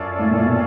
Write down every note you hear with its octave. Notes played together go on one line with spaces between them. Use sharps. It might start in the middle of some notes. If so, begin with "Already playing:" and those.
Already playing: F#2 C#4 F4 A4 D5
A2
A#2
B2